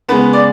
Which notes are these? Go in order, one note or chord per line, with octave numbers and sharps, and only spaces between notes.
C#3 G#3 B3 B4
D5